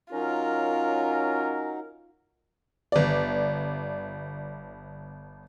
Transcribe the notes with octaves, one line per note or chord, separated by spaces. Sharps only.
F#3 C#4 D#4 F4 A#4
G1 D5